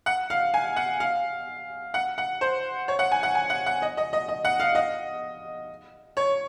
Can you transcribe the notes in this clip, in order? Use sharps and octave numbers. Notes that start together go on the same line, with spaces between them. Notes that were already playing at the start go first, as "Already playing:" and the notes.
F#5
F5
G#5
F#5
F5
F#5
F#5
C5
C#5
F#5
G#5
F#5
G#5
F#5
F#5
D#5
D#5
D#5
D#5
F#5
F5
D#5
C#5